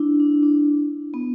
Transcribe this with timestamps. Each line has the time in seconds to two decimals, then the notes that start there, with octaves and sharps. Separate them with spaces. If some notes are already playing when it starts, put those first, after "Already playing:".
Already playing: D4 E4
0.20 D4
0.31 E4
0.43 D4
1.14 B3